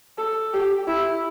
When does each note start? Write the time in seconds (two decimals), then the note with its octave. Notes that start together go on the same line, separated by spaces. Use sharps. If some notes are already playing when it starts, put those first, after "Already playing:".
0.18 A4
0.53 G4
0.88 E4